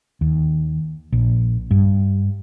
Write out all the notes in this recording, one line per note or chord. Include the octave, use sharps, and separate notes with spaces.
D#2
A#1
G2